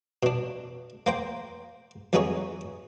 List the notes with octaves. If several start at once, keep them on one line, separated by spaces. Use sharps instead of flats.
B2 D4
A#3 C5 G5
F2 F#3 B3 D#4 G#4 C#5